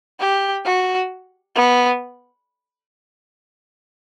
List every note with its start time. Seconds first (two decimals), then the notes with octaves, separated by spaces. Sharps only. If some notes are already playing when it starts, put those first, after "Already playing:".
0.20 G4
0.65 F#4
1.56 B3